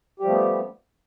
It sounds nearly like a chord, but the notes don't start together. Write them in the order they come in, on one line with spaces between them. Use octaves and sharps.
G4 G3 F3 A3 B3